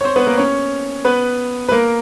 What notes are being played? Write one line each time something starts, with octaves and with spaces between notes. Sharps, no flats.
C#5
C4 C5
B3 B4
A#3 A#4
C#4 C#5
B3 B4
B4
A#3 A#4